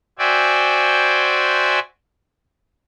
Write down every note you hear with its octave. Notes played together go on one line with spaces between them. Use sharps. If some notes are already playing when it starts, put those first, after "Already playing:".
F#4 C5 D5 E5 G5 G#5